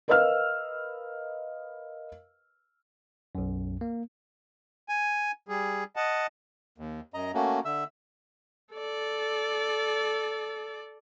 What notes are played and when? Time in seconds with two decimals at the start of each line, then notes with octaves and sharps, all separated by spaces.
0.08 A#4 B4 D#5 F5 E6 F6
3.35 B1 F#2
3.81 A#3
4.89 G#5
5.48 G3 G#4
5.96 D#5 F#5 A5
6.78 D#2
7.14 F#2 D#5 A#5
7.34 A3 A#3 C#4 F#4
7.65 D3 E5 E6
8.74 A4 D5